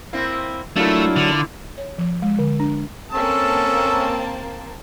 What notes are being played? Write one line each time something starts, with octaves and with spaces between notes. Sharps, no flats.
A#3 C4 E4
F#3 A3 A#3 D4 E4 F4 A#4
D3
C#5
F3
G#3
D3
D4
A#3 C4 C#4 A4 A5 E6